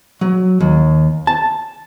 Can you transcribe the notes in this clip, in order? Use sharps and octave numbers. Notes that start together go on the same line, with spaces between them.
F#3
D#2
A5